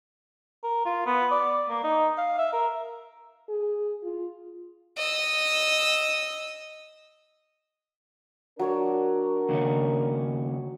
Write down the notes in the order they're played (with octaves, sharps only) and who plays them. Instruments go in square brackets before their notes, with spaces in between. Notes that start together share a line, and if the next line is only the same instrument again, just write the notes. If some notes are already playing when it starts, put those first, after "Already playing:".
[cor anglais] A#4
F4
B3
D5
A#3
D#4
F5
E5
A#4
[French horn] G#4
F4
[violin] D#5 E6
[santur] F#3 C#5 D5 [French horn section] D4 A#4
[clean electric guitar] D#2 C#3 C#4